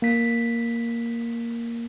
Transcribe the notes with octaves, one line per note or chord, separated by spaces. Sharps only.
A#3 B6